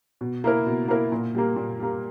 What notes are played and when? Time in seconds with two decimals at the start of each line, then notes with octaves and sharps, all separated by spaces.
0.21 B2
0.44 A#3 E4 A#4
0.66 B2
0.88 A#3 E4 A#4
1.12 A#2
1.35 G3 A#3
1.56 A#2
1.79 G3 A#3